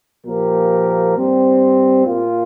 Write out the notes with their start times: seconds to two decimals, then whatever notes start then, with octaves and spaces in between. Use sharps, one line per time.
0.25 A#2 F3 A#3 G4 A#4
1.16 G2 G3 C4
2.05 A#2 A#3 F4